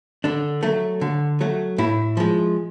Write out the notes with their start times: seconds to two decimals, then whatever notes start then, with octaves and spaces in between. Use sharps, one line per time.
0.24 D3 D4
0.63 F#3 A3
1.01 D3
1.41 F#3 A3
1.78 A2 E4
2.17 F3 G#3